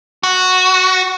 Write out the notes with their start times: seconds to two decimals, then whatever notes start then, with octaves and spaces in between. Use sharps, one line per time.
0.23 F#4